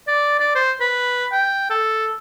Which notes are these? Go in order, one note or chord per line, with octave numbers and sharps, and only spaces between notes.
D5
D5
C5
B4
G5
A4